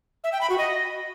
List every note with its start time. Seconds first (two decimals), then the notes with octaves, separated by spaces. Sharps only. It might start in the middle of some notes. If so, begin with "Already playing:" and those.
0.24 E5
0.32 G5
0.41 B5
0.50 F#4
0.58 D#5